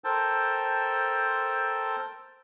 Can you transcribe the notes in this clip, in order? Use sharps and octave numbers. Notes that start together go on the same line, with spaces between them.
A4 A#4 C5 G5 A5